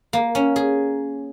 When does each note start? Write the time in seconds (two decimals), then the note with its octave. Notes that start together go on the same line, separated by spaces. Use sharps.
0.13 A#3
0.35 C#4
0.56 G#4